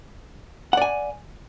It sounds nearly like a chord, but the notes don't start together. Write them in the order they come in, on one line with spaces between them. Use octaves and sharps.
F#5 D5 G#5